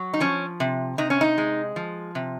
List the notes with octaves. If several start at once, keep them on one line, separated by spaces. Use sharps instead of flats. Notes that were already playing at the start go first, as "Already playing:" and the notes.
Already playing: F#3
D#4
F3 C#4
C3
C3 D#4
C#4
D#4
G#3
F3
C3